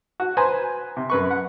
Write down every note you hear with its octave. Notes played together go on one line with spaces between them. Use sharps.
F#4
B4 C5 G#5 A#5
C3
F#2 B4 C#6
F#5